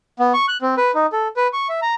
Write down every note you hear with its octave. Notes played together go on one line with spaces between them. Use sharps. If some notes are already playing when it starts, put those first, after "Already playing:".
B3
C#6
F#6
C4
B4
D#4
A4
B4
C#6
E5
A#5